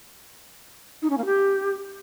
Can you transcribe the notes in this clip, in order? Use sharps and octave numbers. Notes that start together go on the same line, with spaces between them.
D#4
C#4
A#3
G4